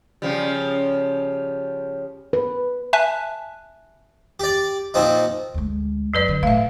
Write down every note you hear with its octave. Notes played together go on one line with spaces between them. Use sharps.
C#3 F3 G3
B4
E5 G#5 A5 F#6
G4 D5
A#2 F3 C4 D#4
D2 G#3
F#2 F#3 B4 D5
D3
A2 A3 E5 F5